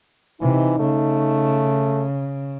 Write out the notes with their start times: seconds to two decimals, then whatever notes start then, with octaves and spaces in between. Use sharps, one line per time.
0.41 C3 E3 D#4
0.79 C#3 A3